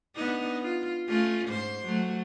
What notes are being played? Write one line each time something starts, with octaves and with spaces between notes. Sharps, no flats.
B3 D4 D#4
F4
A3 C#4 F4
G#2 C5
F#3 A3